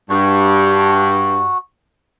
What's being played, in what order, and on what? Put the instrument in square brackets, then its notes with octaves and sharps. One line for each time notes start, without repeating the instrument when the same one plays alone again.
[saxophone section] G2 [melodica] F#4